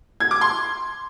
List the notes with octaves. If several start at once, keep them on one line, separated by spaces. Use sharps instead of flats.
G#6
D6
C6